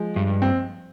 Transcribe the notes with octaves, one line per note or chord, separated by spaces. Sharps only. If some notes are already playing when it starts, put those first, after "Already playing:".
Already playing: F3 G#3
G2
C4